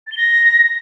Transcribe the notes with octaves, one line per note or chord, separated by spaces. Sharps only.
A6
G7
A#6